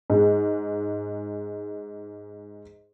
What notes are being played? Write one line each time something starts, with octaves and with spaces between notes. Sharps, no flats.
G#2 G#3